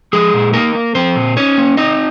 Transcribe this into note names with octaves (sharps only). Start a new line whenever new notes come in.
F3 G#3 G#4
A#2
A#3 D#4 A#4
A#3
F3 C4 C5
A#2
C#4 D#4 C#5
A#3
C4 D#4 D#5